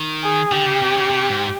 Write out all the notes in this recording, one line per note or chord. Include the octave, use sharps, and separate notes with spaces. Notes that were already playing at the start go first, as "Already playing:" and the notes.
Already playing: D#3
G#4
D3 G4
C#3
C3
C#3
C3
G#2